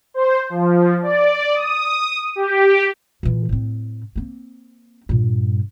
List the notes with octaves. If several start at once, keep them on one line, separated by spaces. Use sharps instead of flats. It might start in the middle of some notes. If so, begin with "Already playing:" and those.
C5
F3
D5
D#6
G4
A#2 E3
A2 C4
A#3 C4
G2 A#2